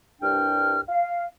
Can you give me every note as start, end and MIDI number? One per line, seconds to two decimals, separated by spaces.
0.21 0.79 36
0.21 0.79 43
0.21 0.79 62
0.21 0.79 79
0.21 0.79 89
0.89 1.23 77